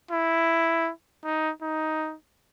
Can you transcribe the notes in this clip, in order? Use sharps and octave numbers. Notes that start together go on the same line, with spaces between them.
E4
D#4
D#4